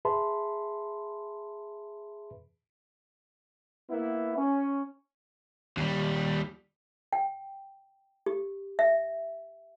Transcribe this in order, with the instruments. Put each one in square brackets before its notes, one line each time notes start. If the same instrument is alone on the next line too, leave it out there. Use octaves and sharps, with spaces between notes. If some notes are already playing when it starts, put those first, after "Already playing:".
[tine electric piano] G#4 B4 E5 A5 B5 C6
[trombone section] A#3 B3 E4
C#4
[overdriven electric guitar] D#2 G3
[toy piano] G5
G4
E5